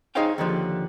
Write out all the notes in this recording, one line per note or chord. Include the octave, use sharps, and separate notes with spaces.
D#4 G#4 C5 C#5 F5 G5
D#2 D3 F3